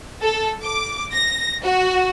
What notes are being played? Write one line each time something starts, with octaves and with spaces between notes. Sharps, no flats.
A4
D6
A#6
F#4